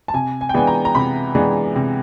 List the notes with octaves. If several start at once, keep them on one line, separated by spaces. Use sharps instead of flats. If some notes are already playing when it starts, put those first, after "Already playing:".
A5
C3 G#5
G#5
G5
E3 G#3 B3 D4 G#5
A#5
A#5
C3 B5
E3 G#3 B3 D4
C3